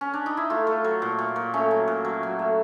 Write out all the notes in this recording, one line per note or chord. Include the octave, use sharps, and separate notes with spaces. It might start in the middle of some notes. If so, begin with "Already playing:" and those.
C#4
D4
D#4
E4
A3 F4
A3
F#3
A#2
A#2
A#2
A3 C#4
F#3
A#2
F#3
F#3
A3